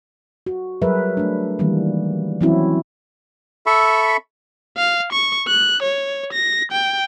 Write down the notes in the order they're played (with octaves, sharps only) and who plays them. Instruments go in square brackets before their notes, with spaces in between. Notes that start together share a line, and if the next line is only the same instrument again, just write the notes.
[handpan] F#4
F#3 G3 G#4 A#4 B4 E5
A3 D4
D#3 E3 G3 A#3
E3 F#3 C4 C#4 E4 F#4
[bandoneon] A4 E5 B5 C#6
[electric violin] F5
C#6
F#6
C#5
A#6
G5